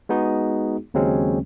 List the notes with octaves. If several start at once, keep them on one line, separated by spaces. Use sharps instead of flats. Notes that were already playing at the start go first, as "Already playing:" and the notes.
G#3 B3 D#4 F#4 G#4
D#2 C#3 F#3 G#3 C4 C#4